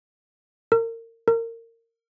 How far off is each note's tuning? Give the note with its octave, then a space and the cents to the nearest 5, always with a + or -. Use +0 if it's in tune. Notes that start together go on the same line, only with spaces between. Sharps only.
A#4 -30
A#4 -25